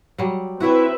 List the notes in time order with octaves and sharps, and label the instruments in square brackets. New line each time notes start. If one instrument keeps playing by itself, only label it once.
[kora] F#3 G3
[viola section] C4 B4 E5 [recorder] E4 [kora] F#4 C#5